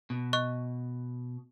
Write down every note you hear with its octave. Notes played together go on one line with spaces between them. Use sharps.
B2
D#5 C#6 F#6